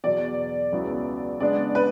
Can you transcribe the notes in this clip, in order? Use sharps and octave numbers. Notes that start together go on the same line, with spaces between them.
E2 B2 F#3 D5
C#2 C#3 F#3 B3 E4
C#3 G#3 B3 D4 D5
B4